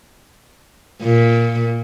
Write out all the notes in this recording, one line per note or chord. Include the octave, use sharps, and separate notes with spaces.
A#2